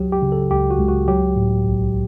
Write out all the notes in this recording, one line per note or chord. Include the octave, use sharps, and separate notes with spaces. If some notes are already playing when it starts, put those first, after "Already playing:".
Already playing: C#2 F#3 G4
G4
C#3
A4
C#2 G4
F#4
C#2
F#4
F#3 G4
A2
B1